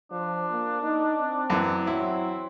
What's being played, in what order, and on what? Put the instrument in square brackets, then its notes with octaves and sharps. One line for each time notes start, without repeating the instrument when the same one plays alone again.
[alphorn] F3 [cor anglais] D4
[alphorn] A#3
D#4
C4
[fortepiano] F#2 E3
[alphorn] F#3 [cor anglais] C4 [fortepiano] E4